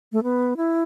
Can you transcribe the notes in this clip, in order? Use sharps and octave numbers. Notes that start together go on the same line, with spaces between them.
A3
B3
E4